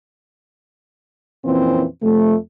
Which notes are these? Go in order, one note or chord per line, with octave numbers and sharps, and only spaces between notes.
F2 A#2 E3 C4 C#4
F2 C3 A3